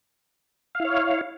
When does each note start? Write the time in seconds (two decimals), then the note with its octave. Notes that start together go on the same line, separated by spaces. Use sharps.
0.75 F5
0.80 E4
0.85 C#5